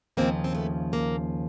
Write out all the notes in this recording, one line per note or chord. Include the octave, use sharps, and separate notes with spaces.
D#2 C#3 F3 A#3 C4
C4
A3 B3
A#3